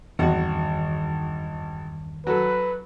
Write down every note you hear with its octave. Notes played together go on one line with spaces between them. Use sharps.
G#1 E2 G2 D#3 F#4 F#5
F#3 A4 B4